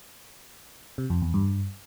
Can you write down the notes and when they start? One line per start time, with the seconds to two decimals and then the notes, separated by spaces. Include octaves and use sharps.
0.98 C3
1.10 F2
1.22 E2
1.34 G2